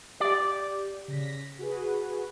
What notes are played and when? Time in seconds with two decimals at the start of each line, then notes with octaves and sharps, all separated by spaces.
0.20 G4 D5
1.08 C#3 A#6 B6
1.59 F#4 G#4 B4